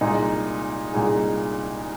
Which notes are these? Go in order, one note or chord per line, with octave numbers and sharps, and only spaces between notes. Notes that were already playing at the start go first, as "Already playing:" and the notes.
C2 A#2 G#3 D#4 G#4
C2 A#2 G#3 D#4 G#4